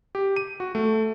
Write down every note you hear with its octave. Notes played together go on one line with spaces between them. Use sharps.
G4
D#7
F#4
A3